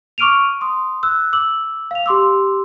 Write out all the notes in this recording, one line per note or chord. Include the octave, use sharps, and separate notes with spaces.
C#6 D6 F6 D7 D#7 F7
C6 D#6
E6 F#6
D6 E6 F#7
F5 F7
G4 C6 D6 E6